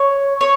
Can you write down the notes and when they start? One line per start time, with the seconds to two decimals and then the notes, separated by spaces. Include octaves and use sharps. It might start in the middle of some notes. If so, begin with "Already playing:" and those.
Already playing: C#5
0.41 C#5